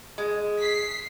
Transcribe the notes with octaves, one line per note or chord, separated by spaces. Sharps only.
G#3
B6 C7